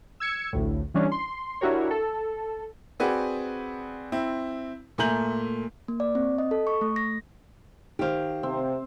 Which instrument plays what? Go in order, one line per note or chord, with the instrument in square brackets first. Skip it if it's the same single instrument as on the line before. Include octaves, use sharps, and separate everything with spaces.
[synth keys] E6 G#6 C#7
A1 D2 A2
E3 G3 C#4 D4
C6
D4 E4 F#4 G4 A#4 C#5
A4
[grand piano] C4 F#4 G#4 B4 D5
C4 E4
A#2 A3 G#5 A#5 G6 F#7
[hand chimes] A#3
D5
C4
D#5
A4
C#6
A3
A#6
[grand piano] D#3 C5 [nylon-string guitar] G4 F5
[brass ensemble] C3 [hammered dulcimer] C4